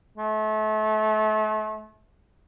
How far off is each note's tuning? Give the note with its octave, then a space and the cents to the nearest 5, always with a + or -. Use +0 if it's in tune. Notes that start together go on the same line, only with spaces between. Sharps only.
A3 -35